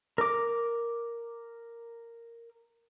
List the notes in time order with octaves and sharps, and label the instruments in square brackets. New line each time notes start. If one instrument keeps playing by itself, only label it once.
[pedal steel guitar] A#4 D6